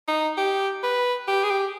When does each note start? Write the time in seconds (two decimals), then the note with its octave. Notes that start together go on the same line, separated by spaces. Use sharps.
0.08 D#4
0.37 G4
0.83 B4
1.28 G4
1.43 G#4
1.50 G4